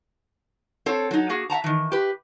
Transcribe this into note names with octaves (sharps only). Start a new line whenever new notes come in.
C4 A4 C5 C#5
F#3 D#4
A#3 F#4 G#4
E5 F#5 A5 A#5
D#3 E3
G4 B4